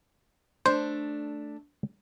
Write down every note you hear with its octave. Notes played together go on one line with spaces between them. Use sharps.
A3 D4 C5